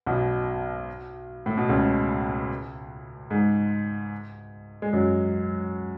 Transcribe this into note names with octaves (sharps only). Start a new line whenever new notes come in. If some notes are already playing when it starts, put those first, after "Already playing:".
B1 B2
A2
B2
C#2 C#3
G#2 G#3
G#3
F#2 F#3